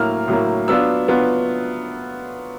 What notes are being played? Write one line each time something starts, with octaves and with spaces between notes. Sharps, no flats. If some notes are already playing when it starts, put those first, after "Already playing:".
Already playing: A2 F#3 A#3 F6
A2 F#3 A#3
F#3 B3 D4 F4 E6
F#3 B3 D4 F4